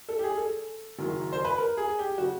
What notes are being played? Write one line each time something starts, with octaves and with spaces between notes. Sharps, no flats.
A4
G4
G#4
A4
F#1 F#2 D#3 F#3
C5
B4
A#4
G#4
G4
C#3 F#3 F#4